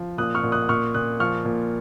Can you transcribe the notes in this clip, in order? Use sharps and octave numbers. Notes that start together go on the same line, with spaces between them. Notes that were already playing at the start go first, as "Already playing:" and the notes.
Already playing: F3
A#2 D#6 F#6
C#6 F6
A#2
D#6 F#6
A#2 C#6 F6
A#2 D#6 F#6
F3 C#6 F6
A#2